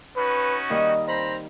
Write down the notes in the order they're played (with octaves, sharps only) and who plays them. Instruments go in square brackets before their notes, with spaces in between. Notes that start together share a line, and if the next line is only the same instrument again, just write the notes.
[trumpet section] C#4 D#4 F#4 [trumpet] B4
[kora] D#3 G3 A#3 [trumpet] D#5
[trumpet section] C4 A#5 B5 [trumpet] C5